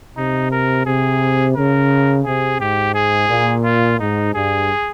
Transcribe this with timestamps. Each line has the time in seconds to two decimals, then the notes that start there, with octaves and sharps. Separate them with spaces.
0.17 C3 D#4
0.52 A#4
0.86 C3 G#4
1.56 C#3 A#4
2.25 C3 G#4
2.59 G#2 G4
2.95 G#4
3.29 A#2
3.64 F4
3.99 G#2 D#4
4.34 G2 G#4